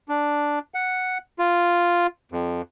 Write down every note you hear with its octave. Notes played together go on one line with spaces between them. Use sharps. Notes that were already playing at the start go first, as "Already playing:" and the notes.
D4
F#5
F4
F2